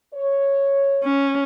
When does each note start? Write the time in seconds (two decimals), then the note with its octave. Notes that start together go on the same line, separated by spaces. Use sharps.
0.14 C#5
1.04 C#4